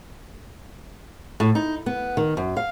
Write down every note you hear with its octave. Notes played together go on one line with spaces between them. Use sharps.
A2
D#4
B3
D#3
F#2
F5